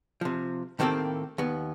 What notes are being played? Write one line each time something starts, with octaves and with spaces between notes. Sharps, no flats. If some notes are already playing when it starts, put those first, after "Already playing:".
C3 F3
A2 D#3 A#3 C4 G4 A4
D#2 B3